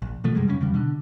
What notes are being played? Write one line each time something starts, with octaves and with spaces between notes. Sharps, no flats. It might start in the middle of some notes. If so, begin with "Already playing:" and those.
A#1
B2 F3 A3
F#2 C3 G3 G#3
F#2 C#3 A#3 C#4
E2 C#3 G3
B2 D3